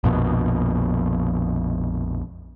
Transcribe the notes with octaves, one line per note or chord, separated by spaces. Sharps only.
A#1 F2 B2